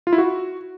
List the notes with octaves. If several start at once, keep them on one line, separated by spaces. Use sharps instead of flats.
F4
E4
F#4